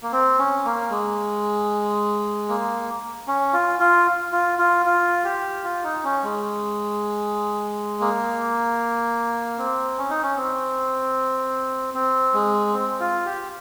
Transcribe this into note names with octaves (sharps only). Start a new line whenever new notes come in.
A#3
C4
C#4
A#3
G#3
A#3
C#4
F4
F4
F4
F4
F4
G4
F4
D#4
C#4
G#3
A#3
C4
C#4
D#4
C#4
C4
C4
G#3
C4
F4
G4